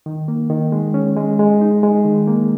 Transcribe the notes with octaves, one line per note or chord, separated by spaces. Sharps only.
D#3
A#3
D#3
G#3
C#4
G#3
G#3
D#4
G#3
D#3
A#3